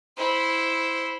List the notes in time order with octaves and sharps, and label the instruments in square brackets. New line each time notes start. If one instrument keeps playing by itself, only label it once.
[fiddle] E4 C5